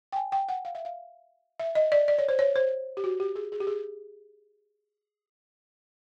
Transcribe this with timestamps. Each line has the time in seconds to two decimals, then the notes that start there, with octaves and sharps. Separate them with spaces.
0.12 G5
0.16 G#5
0.32 G5
0.49 F#5
0.65 F5
0.75 E5
0.85 F5
1.60 E5
1.75 D#5
1.92 D5
2.08 D5
2.18 C#5
2.29 C5
2.39 C#5
2.56 C5
2.97 G4
3.04 F#4
3.20 G4
3.36 G#4
3.52 G#4
3.60 G4
3.67 G#4